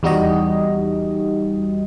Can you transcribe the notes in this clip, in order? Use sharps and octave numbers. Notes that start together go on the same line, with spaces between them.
E2 G3 D#4 F#4 G4 D#5